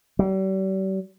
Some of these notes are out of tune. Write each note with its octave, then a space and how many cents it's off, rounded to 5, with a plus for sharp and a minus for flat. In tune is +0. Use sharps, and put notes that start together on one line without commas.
G3 -40